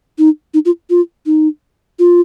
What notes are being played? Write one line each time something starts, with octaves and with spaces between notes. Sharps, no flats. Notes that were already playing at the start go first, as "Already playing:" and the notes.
D#4
D#4
F4
F4
D#4
F4